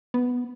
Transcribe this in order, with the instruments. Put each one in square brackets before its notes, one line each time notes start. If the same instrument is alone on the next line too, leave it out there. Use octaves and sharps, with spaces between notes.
[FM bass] B3